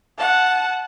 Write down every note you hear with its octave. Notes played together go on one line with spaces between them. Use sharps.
F#5 A5